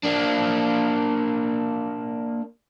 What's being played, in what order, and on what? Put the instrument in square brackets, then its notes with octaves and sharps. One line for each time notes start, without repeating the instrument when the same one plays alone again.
[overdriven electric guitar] A#3 D4